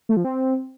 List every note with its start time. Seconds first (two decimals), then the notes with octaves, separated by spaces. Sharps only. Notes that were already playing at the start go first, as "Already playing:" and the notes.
0.09 A3
0.17 F3
0.24 C4